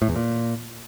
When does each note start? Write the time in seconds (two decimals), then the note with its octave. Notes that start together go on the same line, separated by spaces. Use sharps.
0.02 A2
0.09 E2
0.16 A#2